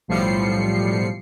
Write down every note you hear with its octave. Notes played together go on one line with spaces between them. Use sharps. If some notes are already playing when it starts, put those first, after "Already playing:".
B1 A2 F3 G3 C7 C#7